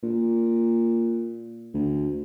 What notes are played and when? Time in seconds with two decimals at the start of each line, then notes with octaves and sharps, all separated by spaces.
0.03 A#2
1.74 D2